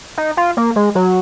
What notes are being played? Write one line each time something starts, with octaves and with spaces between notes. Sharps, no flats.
D#4
F4
A#3
G#3
F#3